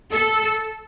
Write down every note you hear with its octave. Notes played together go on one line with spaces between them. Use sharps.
A4